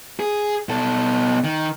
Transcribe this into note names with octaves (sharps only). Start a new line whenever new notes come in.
G#4
B2 A4
D#3